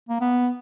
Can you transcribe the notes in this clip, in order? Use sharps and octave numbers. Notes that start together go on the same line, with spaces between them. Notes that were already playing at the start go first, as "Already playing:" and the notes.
A#3
B3